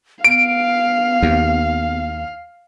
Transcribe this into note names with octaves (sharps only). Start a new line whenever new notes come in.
B3 F5 D7
D#2